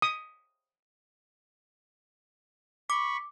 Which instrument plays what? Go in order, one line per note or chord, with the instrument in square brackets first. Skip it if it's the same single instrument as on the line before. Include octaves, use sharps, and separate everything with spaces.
[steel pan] D#6
[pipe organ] B5 C#6 [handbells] D6